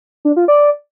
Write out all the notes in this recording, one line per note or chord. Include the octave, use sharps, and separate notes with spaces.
D4
F4
D5